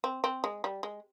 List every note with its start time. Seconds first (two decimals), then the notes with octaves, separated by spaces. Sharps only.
0.04 C4
0.24 C4
0.44 G#3
0.64 G3
0.83 G#3